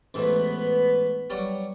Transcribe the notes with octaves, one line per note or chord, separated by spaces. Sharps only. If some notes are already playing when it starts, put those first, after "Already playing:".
A1 G#2 B3 B4 E5
F#3 G3 D5